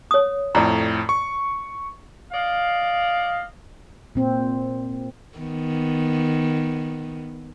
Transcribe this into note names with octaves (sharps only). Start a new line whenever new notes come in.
C#5 D#6
F2 A2 D5 A#5
C#6
D5 D#5 F5
A#2 C4
D#3 B3